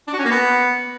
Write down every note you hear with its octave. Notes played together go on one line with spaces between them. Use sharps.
D4
F#4
C#4
A#3
B3